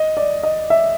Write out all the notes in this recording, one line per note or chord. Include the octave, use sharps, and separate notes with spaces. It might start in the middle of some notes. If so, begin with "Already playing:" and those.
Already playing: D#5
D5
D#5
E5